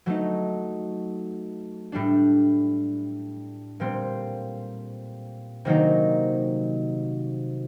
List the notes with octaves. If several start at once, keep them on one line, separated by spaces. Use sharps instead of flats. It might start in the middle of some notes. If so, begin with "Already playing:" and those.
F#3 A3 D#4
A2 G3 D4
A#2 G3 C4
C3 D#3 F#3 A#3 D#4